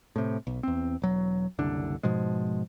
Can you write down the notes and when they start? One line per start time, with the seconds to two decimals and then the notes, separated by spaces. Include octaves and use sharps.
0.16 A2 C3
0.47 B1
0.63 E2 C4
1.02 E1 F#3
1.58 F#1 C2 D3 D4
2.03 G#2 B2 F3 G#3